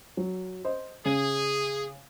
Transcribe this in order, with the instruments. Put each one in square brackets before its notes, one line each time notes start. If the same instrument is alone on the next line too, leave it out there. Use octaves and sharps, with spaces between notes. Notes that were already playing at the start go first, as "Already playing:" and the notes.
[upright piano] F#3
C5 D#5
[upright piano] C#3 [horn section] G#4